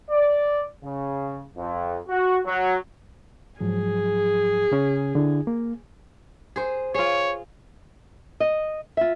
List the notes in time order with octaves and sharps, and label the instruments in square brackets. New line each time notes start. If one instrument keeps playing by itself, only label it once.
[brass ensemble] D5
C#3
F2
F#4
F#3
[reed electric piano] G#2 F3 F#3 [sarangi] G#4
[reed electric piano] C#3 C#4
D3 D4 E4
A#3
[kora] G#4 C5
[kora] F4 G#4 [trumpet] C#5
[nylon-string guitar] D#5
F4 E5